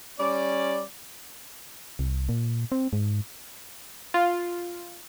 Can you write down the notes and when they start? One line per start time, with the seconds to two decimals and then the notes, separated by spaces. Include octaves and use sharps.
0.17 G3 C#4 D5
1.99 C2
2.29 A#2
2.72 C4
2.93 G#2
4.14 F4